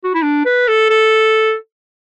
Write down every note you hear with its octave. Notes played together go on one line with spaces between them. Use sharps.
F#4
E4
D4
B4
A4
A4